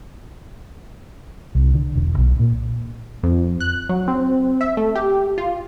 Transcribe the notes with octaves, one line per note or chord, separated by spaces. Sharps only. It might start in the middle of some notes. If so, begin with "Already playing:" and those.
C2
D3
E1
B1
A#2
F2
F#6
F#3
C4
E5
A3
G4
F4